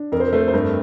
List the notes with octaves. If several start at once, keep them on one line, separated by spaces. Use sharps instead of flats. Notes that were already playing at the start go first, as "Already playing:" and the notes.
Already playing: D4
F2 A#4
C5
A#4
A3 C5
A#4
C5
G2 A#4